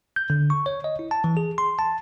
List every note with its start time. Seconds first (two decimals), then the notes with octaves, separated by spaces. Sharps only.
0.16 G6
0.30 D3
0.50 C#6
0.66 C#5
0.84 D#5
0.99 E4
1.11 A5
1.24 E3
1.37 G#4
1.58 C6
1.79 A5